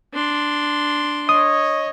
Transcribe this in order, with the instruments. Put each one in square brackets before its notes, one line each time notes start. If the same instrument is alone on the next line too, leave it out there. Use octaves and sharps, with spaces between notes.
[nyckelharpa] D4 C6
[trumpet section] C#5 D#5 [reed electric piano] D#6